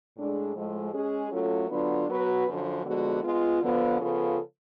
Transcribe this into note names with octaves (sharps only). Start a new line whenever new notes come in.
A2 G#3 D4 G#4
A2 F3 G#3
G#3 C#4 G#4
F#3 A3 C#4 F4 A4
D3 F#3 B3 D4 F4
F#3 B3 F#4 B4
F#2 D3 F3
D3 F3 G#3 B3 F#4
G#3 B3 F4
D3 F3 B3 F4
C#3 F3 B3 F4 A4